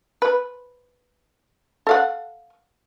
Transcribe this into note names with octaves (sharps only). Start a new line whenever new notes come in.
B4
A4 F5 F#5